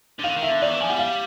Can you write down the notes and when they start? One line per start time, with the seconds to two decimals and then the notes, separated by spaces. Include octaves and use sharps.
0.19 D3
0.23 D#3 F5
0.30 D3
0.37 D#3
0.42 E5
0.49 D3
0.61 D#3 D5
0.70 E3
0.80 F3 G#5
0.90 G3 F#5
0.99 F5